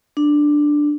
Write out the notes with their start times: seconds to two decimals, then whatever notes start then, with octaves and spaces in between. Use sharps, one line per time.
0.17 D4